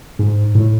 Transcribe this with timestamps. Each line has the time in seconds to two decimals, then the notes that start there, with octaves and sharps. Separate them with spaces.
0.19 G#2
0.55 A2